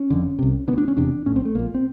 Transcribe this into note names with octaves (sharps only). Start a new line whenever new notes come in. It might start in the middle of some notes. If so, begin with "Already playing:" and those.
Already playing: C#4
F#1 F2 D3
C2 C3
D3 B3
D2 D4
C#4
E1 E2 C3 D4
A#1 A2 C#4
C4
A3
A#1 A#2 A#3
C4